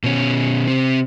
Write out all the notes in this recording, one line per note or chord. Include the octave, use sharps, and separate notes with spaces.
B2 C#4
C3 C4